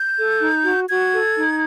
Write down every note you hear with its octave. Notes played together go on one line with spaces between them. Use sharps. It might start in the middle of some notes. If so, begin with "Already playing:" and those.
Already playing: G6
A4
D#4
F#4
F#4 G#6
A4
D#4